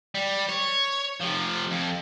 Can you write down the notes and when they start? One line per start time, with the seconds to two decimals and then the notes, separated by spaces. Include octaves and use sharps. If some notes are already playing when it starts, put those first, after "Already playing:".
0.15 G3
0.49 C#5
1.20 C3 F3
1.71 F2